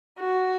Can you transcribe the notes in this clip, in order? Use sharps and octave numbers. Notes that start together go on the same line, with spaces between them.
F#4